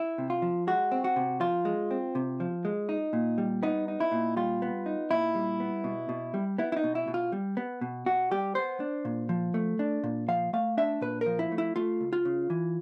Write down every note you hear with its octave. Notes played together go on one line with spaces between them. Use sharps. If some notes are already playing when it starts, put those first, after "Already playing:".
Already playing: E4
C3
F4
F3
G#3 F#4
C4
F#4
C3
F3 F4
G#3
C4
C3
F3
G#3
D#4
A#2
G3
B3 D#4
D#4
E4
A#2
G3 F4
B3
D#4
A#2 E4
G3
B3
B2
B2
G3
B3 E4
E4
D#4
B2
E4
B2
F4
G3
B3
B2
B2 F#4
G3 G4
B3 C5
D4
A#2
F3
A3
D4
A#2
F3 F5
A3 F5
D4 E5
A#2 B4
A#4
F3
E4
A3
E4
A3 F4
C#2
F4
C#3
E3